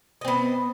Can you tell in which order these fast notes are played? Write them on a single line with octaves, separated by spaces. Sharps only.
D#5 C4 B3